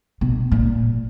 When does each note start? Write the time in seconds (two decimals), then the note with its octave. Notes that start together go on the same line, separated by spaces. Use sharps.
0.21 B2
0.52 A#2